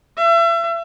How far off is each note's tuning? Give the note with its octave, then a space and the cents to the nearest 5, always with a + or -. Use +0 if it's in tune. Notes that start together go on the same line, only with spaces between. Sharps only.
E5 +35